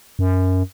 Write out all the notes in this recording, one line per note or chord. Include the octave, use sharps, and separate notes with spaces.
F#2